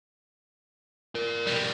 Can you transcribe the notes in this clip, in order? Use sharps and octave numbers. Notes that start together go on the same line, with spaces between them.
A#4 D5
B2 G3